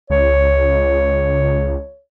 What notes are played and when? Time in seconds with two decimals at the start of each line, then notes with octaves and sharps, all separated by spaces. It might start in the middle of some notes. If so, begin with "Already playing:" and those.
0.10 C#2 C#5